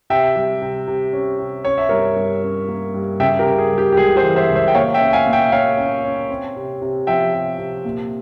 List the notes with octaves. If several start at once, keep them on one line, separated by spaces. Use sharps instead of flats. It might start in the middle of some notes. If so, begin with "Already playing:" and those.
C3 E5 G5
G3
C3
C3
C#4
C3
C#4 C#5
E5
G2 A#4 C#5
G2
C#4
A#3
G2
C#3 E5 G5
G4 A#4
C#3
G#4
G3
G4
G4
C#2 G#4
G#4 C5
E3
C5 E5
C#2
C5 E5
G5
A#2 C#5 F5
E5 G5
C#4
F5 G#5
A#2
E5 G5
A#2 C#5 F5
C#4
C#4
C4
C3
C3
F3 E5 G5
C3
C3
A#2